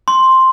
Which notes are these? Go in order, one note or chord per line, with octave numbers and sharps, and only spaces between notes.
C6